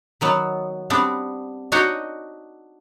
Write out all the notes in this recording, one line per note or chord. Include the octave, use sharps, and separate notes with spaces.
D#3 F#3 B3
G3 B3 C4 D4
D4 D#4 F#4 C#5 D#5 F#5